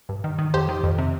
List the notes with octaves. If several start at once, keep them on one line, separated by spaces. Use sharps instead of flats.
G2
D#3
D#3
F2 G4 C5
D#3
F2
C3